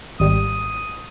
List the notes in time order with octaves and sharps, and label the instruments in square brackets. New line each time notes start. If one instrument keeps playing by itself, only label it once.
[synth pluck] G#1 G3 [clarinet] D#6